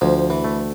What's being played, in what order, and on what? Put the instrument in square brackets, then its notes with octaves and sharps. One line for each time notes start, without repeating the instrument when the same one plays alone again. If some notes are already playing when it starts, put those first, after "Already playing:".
[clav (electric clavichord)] D2 [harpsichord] F3
[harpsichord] E3
[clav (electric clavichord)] A3